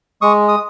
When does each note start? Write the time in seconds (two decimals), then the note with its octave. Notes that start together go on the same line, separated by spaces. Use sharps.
0.21 G#3 C#6 D#6
0.48 D#6